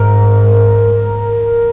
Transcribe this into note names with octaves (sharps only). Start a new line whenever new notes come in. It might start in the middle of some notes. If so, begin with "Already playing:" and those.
Already playing: G#2 A#4